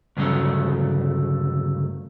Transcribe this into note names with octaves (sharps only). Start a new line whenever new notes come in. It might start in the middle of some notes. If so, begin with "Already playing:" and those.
D2 G2 C#3 F#3 A3